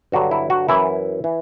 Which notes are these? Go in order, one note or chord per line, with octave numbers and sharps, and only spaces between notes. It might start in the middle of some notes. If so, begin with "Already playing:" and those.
G2 D3 F#3 F#4
E4
F#4
F#2 E3 E4
E3